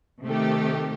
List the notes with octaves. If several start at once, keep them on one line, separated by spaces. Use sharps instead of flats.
C3 D#3 A3 G4